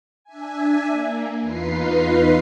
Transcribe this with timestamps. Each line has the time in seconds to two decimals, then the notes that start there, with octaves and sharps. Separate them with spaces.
0.24 D4 E5 G#5
0.89 A#3
1.41 E2 D#4 F4 B4 C7